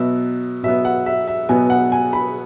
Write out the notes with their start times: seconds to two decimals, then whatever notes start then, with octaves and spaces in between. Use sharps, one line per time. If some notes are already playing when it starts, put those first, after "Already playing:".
Already playing: B2 F#3 B3 E5
0.63 B2 F#3 B3 E5
0.85 F#5
1.06 E5
1.27 E5
1.49 B2 F#3 B3 G#5
1.70 F#5
1.92 G#5
2.13 B5